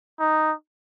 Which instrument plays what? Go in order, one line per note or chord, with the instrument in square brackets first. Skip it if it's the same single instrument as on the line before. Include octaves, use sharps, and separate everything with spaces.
[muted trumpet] D#4